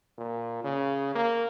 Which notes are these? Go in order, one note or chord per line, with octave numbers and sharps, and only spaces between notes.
A#2
C#3
A#3